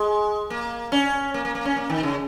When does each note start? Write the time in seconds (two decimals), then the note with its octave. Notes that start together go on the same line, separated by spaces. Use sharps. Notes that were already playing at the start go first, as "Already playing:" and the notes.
Already playing: G#3
0.50 A#3
0.92 C#4
1.34 A#3
1.45 A#3
1.55 A#3
1.65 C#4
1.76 A#3
1.90 D#3
2.03 C#3